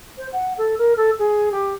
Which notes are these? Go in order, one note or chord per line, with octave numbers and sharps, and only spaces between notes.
C5
F#5
A4
A#4
A4
G#4
G4